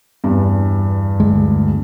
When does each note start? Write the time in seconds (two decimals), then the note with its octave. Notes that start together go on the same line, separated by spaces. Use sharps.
0.24 E2 G2
1.20 D2 G#3